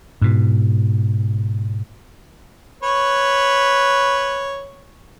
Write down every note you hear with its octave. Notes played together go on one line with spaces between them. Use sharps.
G#2 B2
B4 C#5